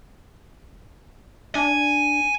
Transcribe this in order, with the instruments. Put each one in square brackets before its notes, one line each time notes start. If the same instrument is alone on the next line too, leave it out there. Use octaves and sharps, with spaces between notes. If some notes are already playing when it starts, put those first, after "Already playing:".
[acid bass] D4 [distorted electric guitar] G#5